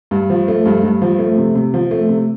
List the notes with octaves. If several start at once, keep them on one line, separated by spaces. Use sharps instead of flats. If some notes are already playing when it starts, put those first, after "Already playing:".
G2
F3
A3
G2
G2
F3
A3
C3
C3
F3
A3
C3